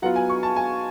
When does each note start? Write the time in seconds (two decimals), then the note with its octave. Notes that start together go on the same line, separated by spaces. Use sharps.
0.02 F#3 B3 F4 F#5
0.16 G#5
0.30 C#6
0.43 A5
0.56 G#5